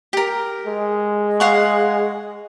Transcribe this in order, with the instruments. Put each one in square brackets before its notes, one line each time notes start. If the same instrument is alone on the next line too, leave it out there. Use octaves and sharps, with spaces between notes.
[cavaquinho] G4 A#4
[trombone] G#3
[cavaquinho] F5 F#5 C#6